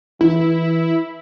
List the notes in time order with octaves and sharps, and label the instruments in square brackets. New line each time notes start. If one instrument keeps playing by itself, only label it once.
[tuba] E3 [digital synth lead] E4